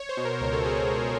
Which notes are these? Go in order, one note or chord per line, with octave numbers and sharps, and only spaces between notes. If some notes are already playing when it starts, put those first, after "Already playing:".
Already playing: C#5
C5
B2
A#4
C#2 A#4
A4
B2 G#4
A4
C#2